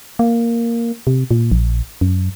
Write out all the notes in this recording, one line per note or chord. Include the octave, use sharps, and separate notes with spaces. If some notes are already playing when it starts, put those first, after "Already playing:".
A#3
C3
A#2
A#1
F#2